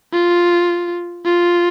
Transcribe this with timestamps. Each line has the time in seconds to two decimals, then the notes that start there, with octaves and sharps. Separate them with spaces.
0.13 F4
1.25 F4